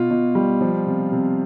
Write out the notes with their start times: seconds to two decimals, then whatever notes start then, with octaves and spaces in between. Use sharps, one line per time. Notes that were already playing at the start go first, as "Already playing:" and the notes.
Already playing: B2 F4
0.10 B2
0.35 G3
0.61 F3
0.86 C3
1.12 C3